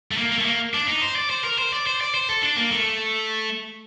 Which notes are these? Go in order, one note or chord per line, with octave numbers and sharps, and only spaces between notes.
A3
A#3
A#3
A3
A#3
D4
D#4
C5
D5
C5
A#4
C5
D5
C5
D5
C5
A4
D4
A#3
A3